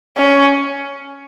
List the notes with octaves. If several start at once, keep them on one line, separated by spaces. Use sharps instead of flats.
C#4